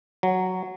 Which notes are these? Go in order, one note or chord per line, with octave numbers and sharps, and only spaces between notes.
F#3